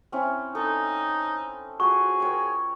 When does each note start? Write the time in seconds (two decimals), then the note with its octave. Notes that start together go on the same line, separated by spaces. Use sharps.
0.12 C4 C#4 E4
0.55 D#4 A4
1.80 F4 F#4 G#4 C#6
2.20 A#4 C#5 G5